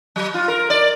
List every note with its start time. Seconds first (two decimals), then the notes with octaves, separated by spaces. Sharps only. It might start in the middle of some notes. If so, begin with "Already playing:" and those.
0.16 F#3
0.34 F4
0.48 A#4
0.70 D5